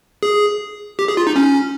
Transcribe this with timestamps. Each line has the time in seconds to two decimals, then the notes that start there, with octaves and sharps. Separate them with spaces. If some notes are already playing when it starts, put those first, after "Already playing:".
0.23 G#4
0.99 G4
1.08 G#4
1.17 F4
1.27 D#4
1.36 C#4